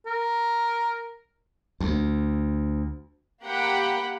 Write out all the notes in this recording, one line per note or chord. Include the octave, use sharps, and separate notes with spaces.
A#4
D2
A#3 G4 F#5 G5 B5